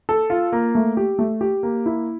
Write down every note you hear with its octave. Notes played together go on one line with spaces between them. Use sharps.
A4
F4
A#3
A3
G4
A3
G4
A#3
E4